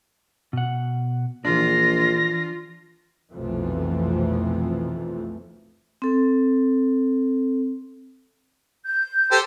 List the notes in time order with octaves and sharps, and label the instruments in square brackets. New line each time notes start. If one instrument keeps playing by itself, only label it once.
[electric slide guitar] B2 F#5
[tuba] A#1 [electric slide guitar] E3 D4 [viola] F4 [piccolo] A#6
[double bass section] B1 F2 C3 E3 F3 A3
[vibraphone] C4 A4
[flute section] G6
[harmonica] G4 A4 C5